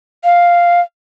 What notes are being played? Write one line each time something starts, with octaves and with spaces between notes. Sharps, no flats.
F5